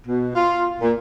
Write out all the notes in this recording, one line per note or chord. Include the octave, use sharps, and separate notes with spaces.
B2
F4
A#2